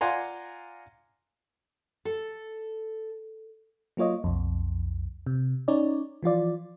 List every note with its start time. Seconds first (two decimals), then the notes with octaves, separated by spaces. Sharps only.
0.01 F4 D5 F#5 G#5 A#5 C6
2.05 A4
3.97 F#3 A#3 F4 C#5 D#5
4.24 B1 F2
5.27 C3
5.68 C#4 D#4 C#5 D5
6.23 E3 F3 F4 D5